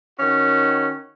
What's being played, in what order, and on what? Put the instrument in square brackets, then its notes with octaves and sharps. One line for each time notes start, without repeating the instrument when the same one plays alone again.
[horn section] D#3 C#4 F#4